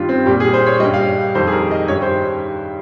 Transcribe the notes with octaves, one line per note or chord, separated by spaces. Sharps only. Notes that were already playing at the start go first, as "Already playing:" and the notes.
Already playing: G2 D#3 G3 F4
C4
A#2 G3 G4
G#4
C5
C#5
G2 G3 D#5
F5
F2 D#3 G3 C5
G#4
A#4
D#5
G2 D#3 G3 C#5
C5